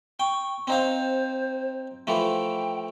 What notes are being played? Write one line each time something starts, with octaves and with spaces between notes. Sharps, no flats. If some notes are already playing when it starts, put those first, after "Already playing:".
G5 C#6
C4 D#4 C5 F5
E3 F3 A3 G5